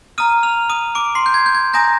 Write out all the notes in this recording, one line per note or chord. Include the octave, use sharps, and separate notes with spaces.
A#5 D#6 F6 D#7
F6 F7
D#6 D#7
D6 D7
C6 C7
G6
G#6
G6
G#6
G#5 A#5 D#6 G6 A#6